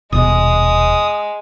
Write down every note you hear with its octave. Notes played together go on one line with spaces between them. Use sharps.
D#1 B2 G#3 D#6